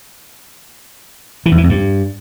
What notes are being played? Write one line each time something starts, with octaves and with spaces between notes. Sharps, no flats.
E3
E2
E3
F2
G2